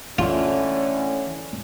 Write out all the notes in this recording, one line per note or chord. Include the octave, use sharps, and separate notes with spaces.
A2 D3 E3 A3 C#4 E4 F4